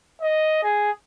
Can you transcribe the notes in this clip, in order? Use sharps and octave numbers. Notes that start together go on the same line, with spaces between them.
D#5
G#4